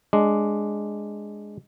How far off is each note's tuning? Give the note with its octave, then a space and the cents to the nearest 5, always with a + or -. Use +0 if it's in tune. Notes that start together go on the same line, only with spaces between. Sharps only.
G#3 +0 D4 +0